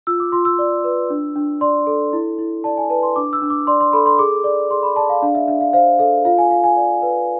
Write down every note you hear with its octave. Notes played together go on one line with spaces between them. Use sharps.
F4 E6
D6
F4 C6
E6
D5
B4
D4
D4
D5 C6
A4
E4
E4
D5 A5
G#5
B4 A5
C6
D4 D6
E6
D4
D6
D5 C6
C6
A4 B5
C6
G#4 D6
D5
G#4 C6
B5
D5 A5
F5
D4 F5
E5
D4 E5
F5
C5 F5
A4 F5
F4 F5
G#5
F4 F5
G#5
D5
B4